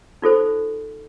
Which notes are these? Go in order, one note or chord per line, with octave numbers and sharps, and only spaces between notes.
D#4 F4 A4 C5